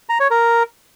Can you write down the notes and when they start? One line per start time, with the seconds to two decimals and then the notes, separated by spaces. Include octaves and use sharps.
0.09 A#5
0.20 C#5
0.31 A#4